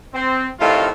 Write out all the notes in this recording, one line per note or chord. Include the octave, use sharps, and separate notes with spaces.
C4
A2 C3 D#3 F4